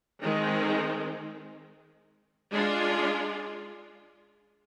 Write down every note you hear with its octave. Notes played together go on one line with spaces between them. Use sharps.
D#3 G#3 C4
G#3 D4 F4 G#4